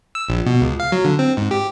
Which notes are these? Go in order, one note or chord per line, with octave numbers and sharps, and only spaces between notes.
E6
A#1
B2
C#2
F5
F#3
D3
C4
G#2
G4